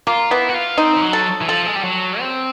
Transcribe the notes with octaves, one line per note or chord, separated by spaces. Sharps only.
A#3 F4
B3 E4
F#4
F4
C4 D#4
F3
F#3
A4
E3
F3 A4
G#3
G3
F#3
C4